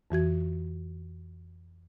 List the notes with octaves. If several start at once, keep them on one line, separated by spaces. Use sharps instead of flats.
F2 E3 F#4 G#6